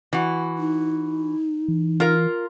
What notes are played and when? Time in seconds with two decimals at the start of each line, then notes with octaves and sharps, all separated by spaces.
0.13 E3 F#4
0.58 D#4
1.68 E3
2.00 F4 A#4 F5